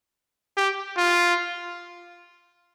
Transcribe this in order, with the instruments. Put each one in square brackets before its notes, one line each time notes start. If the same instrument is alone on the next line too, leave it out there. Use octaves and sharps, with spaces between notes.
[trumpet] G4
F4